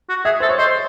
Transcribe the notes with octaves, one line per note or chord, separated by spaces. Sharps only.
F#4
G#4 E5
A4 C5
C#5
C5 D#5